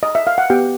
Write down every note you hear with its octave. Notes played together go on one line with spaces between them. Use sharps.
D#5
E5
F5
F#5
B3 G4 G5